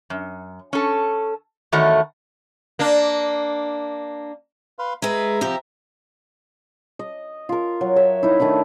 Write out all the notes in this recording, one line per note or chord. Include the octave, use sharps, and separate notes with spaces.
F#2
C#4 A4
E2 D#3 A3 F#4 C#5
A#3 D4
B4 F5 C6
G#3 G#4 B4 E5 A#5
C3 F3 G4
D#5
F4 A#4
F#3
C#5 E5 A#5
D#4 E4
D#3 A3 D4 E4